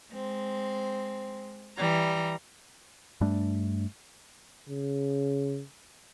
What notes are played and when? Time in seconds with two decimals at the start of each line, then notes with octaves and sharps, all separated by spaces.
0.12 G#3 C4
1.78 E3 G3 A#5
3.21 G2 G3 A3 D4
4.69 C#3